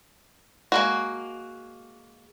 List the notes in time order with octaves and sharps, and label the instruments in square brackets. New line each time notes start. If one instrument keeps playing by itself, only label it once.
[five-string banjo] G#3 A#3 F#4